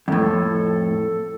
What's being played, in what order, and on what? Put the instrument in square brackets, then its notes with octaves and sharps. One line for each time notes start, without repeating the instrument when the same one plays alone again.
[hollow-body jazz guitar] F2 A2 [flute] A4